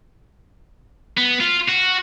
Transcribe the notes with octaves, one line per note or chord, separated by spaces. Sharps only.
B3
F4
F#4